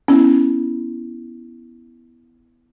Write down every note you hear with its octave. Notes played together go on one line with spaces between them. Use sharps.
B3 C#4 E4